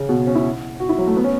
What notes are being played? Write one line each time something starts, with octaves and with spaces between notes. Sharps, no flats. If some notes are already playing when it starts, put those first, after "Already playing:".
Already playing: C#3
B2
C#4
E4
F#4
E4
F#3
A3
B3
C#4